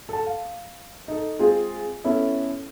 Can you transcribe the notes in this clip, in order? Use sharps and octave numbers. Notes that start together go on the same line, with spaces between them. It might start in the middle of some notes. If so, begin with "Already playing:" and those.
A4 A5
F5
D#4 A4
G#3 C4 F4 G#4
B3 C#4 E4 A4